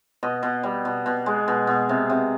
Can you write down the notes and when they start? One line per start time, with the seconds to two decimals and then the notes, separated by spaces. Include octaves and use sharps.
0.23 B2 D#5
0.43 B2
0.63 G3
0.85 B2
1.06 B2
1.26 G#3
1.48 B2
1.67 B2
1.89 C3
2.10 C3